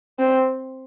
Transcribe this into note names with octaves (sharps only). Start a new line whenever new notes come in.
C4